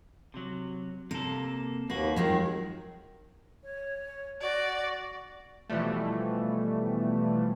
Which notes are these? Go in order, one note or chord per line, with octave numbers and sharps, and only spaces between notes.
C3 F#3
C3 A#3 A4
D#2 A#3 F#4 B4
F2 D#3 F3 F#3 G#3
C#5
F#4 D5
B2 E3 F3 G3 A3